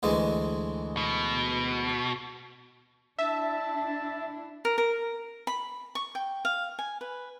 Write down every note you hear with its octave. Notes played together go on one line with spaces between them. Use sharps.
D2 E3 G#3
B2
D4 E4 E5 A5
A#4
A#4
B5
C#6
G5
F5
G#5
B4